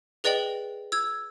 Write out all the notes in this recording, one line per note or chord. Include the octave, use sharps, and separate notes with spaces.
G#4 B4 D5 D#5 G5 F#7
E6 G#6